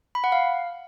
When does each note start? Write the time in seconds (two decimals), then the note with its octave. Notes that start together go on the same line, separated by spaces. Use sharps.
0.15 B5
0.24 F#5
0.32 F5